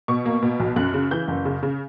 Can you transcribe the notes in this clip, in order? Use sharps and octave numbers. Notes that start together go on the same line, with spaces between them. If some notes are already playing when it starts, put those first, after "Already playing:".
B2 C#6
A#3
B2
B1
F#2 F#6
C#3
E3 G6
F#1
C#3
C#3